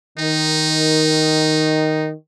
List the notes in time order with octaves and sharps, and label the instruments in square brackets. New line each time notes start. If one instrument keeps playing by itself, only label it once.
[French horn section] D#3 [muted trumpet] D#4